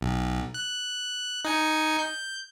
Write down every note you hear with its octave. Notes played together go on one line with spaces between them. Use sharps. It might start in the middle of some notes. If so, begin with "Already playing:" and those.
B1
F#6
D#4 G#5 C#7
G6